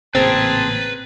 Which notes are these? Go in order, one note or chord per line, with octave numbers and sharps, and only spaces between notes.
A1 A#2 C#3 C4 G#4 B4 A5 A#5